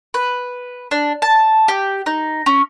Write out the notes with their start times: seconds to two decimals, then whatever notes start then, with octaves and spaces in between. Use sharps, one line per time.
0.14 B4
0.91 D4
1.22 A5
1.68 G4
2.06 D#4
2.46 C#4